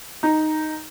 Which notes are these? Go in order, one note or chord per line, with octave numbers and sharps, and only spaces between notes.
D#4